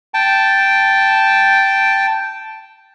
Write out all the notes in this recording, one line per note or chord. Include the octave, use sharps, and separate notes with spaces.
G5 A5